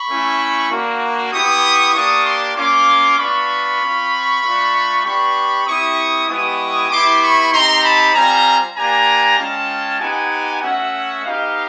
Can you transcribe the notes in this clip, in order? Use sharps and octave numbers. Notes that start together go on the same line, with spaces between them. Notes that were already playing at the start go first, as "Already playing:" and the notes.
Already playing: B5 C#6
A3 C#4 E4
A#3 D4 F#4
B3 E4 G4 C#6 D#6
A#3 D4 G4 C#6 D#6
C6 D6
A#3 C#4 F4 C6 D6
B3 D4 F4 B5 C#6
C4 F4
A3 D4 F4
B3 D4 G4 B5 C#6
C4 E4 G4 C#6 D#6
G#3 B3 E4 G4 C#6 D#6
B3 E4 G4 C6 D6
B5 C#6
C4 D#4 G4 A#5 C6
A5 B5
G3 C4 F4 G#5 A#5
A#3 D4 G4 G#5 A#5
G#3 C#4 F4 G5 A5
B3 D#4 G4 F#5 G#5
A3 C#4 F#4 E5 F#5
B3 D#4 G4 D#5 F5